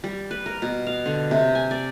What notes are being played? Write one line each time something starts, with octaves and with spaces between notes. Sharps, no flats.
G3
B4
A#4
B2
F5
D3
C3
G#5
D5